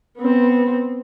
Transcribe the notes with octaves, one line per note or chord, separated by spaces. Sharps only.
B3 C4